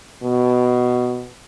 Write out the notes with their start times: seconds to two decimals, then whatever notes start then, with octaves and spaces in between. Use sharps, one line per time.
0.23 B2